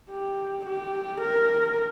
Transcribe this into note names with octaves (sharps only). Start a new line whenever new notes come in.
G4
G4
A#4